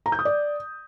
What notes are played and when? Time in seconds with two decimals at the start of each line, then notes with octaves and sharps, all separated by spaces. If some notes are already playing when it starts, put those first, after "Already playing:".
0.06 A#5
0.12 G6
0.19 D#6
0.25 D5